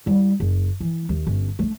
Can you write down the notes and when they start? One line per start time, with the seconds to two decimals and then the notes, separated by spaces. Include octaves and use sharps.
0.06 G3 E4
0.40 F#1
0.81 E3
1.09 D#2
1.27 G1 C#4
1.59 A3 D4